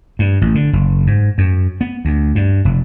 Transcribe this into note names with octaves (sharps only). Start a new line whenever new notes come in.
G2
A1
D3
F#1
G#2
F#2
B3
D2
G2
F1